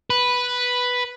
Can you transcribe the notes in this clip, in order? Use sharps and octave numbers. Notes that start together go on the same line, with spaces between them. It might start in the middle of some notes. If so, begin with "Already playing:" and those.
B4